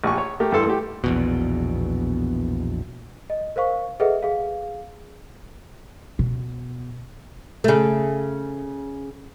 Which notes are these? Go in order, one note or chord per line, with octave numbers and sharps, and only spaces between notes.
A#1 G4 G#5 C#6
C#5
A3 G4 A#4
G2 E3 A4 C6
A3 G4
A#1 E2 B2
D#5
A#4 C5 F5 C#6
G#4 A4 B4 D#5 E5 F#5
G#4 F5
B2
C#3 A3